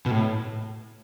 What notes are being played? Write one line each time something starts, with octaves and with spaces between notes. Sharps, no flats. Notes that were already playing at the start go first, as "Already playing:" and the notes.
B2
A2